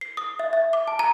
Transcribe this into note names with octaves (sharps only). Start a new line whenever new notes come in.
C7
D#6
E5
E5
D6
A5
A#5